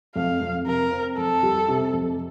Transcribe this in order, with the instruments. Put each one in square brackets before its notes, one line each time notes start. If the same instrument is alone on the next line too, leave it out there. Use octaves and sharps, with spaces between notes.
[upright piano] F2 [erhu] F5
[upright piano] F2
[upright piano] C3 [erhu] A#4
[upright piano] C4
[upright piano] F2 [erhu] A4
[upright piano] G3
C3
F2